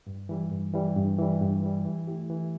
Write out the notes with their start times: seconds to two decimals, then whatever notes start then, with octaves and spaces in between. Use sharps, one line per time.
0.07 G2
0.29 E3 G3
0.52 G2
0.73 E3 G3
0.96 G2
1.18 E3 G3
1.41 G2
1.62 E3 G3
1.85 E3
2.07 A3 E4 G4
2.30 E3